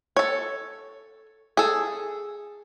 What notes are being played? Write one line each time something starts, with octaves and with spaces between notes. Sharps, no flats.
A4 C#5
G#4 A4